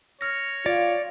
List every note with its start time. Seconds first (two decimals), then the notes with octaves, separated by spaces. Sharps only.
0.21 C#5 F6 A#6
0.66 F4 D5